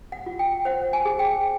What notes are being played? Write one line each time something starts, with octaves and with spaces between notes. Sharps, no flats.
F#5
F4
G5
C5 F#5
G#5
G#4
G5